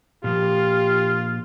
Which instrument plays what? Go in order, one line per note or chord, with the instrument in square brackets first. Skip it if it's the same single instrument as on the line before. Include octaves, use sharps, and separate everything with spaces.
[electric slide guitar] A#2 F3 A#3 [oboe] F4 [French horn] G4